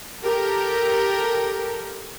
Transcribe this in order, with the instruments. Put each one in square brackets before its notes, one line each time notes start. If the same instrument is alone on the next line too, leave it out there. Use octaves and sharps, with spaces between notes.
[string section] G4 A4 A#4